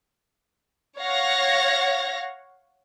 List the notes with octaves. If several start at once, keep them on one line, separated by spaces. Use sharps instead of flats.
C#5 F5 F#5 A#6